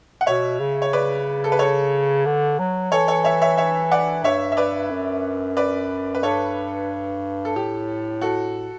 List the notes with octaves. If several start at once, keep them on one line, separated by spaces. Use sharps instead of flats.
F#5
B2 C#5 E5
C#3
C#5
B4 D5
A4
B4
A4 C#5
D3
F#3
E3 A4 C#5
A4 C#5
C#5 E5
C#5 E5
C#5 E5
D5 F#5
G2 C#5 E5
E5
B4 D5
F#2
B4 D5
B4
G2 A4 C#5
A4
A2 G4
F#4 A4